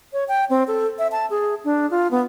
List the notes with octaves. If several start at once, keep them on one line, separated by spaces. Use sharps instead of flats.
C#5
G5
C4
A4
E5
A5
G#4
D4
F4
B3